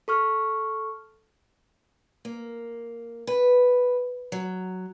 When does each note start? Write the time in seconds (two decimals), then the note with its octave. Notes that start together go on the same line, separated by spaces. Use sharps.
0.08 A4 C#6 F6
2.25 A#3
3.27 B4
4.32 F#3